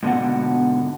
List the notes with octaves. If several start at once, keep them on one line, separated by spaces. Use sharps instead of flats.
G#2 B2 D3 F#5